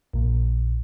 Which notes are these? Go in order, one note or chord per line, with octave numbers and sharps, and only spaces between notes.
A#1 A#2